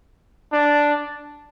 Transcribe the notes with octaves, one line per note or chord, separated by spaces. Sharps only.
D4